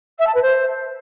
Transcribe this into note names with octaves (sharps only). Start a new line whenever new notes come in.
E5
A5
B4
C5